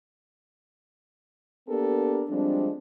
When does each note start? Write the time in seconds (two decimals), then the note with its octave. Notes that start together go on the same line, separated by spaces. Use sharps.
1.68 A#3 B3 D4 G4 A4 A#4
2.29 F3 G3 G#3 C4 D4